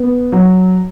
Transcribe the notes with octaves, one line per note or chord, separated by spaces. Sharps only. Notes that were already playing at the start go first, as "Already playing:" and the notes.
Already playing: B3
F#3